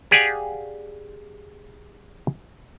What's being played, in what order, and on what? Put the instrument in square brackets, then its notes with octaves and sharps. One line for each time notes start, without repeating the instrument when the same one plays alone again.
[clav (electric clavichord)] G4 G#4 D5 F5 F#5 G#5